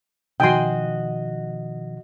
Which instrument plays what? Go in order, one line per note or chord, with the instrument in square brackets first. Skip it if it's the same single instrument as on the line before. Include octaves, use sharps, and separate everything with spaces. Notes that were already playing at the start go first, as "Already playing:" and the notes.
[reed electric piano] B2 D#3 F3 [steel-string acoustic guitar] F#4 D#5 [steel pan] G5 G#5 C6